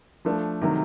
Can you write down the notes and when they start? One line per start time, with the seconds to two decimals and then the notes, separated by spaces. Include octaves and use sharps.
0.25 F3 A3 D4
0.61 C3 D#3 F#3 A3